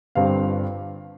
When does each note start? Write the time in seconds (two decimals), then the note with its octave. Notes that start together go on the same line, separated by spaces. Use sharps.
0.15 G1 G2 G3 C4 F5